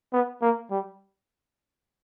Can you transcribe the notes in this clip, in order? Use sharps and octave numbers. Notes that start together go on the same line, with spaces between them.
B3
A#3
G3